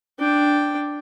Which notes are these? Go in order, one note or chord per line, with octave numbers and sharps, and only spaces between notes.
D4 G5